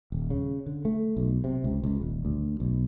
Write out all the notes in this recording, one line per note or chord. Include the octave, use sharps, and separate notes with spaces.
D#1
C#3
D3
A3
B1
C3
C#2
C#2
D#1
D2
B1